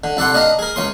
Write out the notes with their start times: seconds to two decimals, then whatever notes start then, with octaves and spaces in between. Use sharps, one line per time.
0.04 D3
0.17 C2 A4 D5 F#5 C6
0.34 D4 D#5 F5 A#5
0.59 G#4 A#4
0.76 C#2 C#4 C6